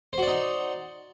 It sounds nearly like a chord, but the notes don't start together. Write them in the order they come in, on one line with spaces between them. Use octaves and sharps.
C5 F#4 D5 D#4